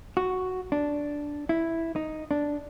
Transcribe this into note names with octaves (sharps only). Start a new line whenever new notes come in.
F#4
D4
E4
D#4
D4